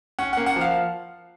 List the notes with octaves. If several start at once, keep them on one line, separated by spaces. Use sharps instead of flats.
C#4 F#5
A#3 F#5
F#5
F3
F5